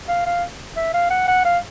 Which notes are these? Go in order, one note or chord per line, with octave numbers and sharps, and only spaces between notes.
F5
F5
E5
F5
F#5
F#5
F5